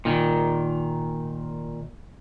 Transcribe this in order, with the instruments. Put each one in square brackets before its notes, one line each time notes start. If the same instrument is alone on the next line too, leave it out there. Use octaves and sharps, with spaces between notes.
[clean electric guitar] A#2 D#3